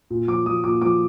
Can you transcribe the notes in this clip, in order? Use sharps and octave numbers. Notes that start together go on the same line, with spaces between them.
A#2
F3 D6
F3 D#6
A#2 D6
F3 D6